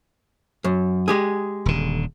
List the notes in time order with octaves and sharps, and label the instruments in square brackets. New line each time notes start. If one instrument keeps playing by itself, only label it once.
[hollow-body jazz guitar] F#2
G#3 G4 G#4
[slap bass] D#1 D3